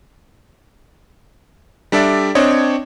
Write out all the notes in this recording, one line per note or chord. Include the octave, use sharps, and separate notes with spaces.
G3 D4 A4 D5 E5
C4 D4 C#5 D#5